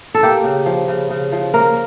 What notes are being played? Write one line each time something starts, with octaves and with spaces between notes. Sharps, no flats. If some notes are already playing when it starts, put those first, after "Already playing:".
A4
A#3 G4
C#3
F3
C#3
C#3
F3
A#3 A#4